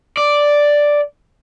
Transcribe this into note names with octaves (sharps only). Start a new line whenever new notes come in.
D5